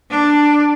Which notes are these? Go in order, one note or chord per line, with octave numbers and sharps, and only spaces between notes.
D4